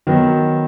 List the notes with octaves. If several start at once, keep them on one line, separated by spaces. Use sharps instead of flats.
D#3 F#3 B3